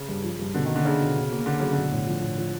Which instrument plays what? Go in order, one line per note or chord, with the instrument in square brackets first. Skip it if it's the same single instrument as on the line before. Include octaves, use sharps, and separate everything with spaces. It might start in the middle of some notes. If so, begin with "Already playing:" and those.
Already playing: [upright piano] C#3
[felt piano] G2
F3
G2
[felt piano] B2 [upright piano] D3
[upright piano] D#3
[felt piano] A#3
[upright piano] D3
[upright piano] C#3 [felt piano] D4
[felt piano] B2
B2
A#3
[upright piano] D3 [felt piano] A#3
[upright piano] C#3 [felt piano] F#3
[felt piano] B1 [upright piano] D3
[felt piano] A2
F3
A2
F3